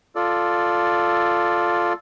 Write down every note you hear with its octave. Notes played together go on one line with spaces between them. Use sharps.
F4 A4 D5